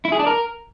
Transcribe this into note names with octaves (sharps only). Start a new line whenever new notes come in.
E4
G#4
D4
A#4